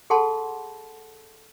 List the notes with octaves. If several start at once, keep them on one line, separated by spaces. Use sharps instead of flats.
G#4 A4 F#5 A5 B5 C6